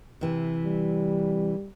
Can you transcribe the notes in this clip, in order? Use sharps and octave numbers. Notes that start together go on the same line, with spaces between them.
C3 E3
G3